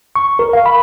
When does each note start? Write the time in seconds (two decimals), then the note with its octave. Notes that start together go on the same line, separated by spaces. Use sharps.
0.16 C#6
0.39 A#4
0.53 F5
0.66 B5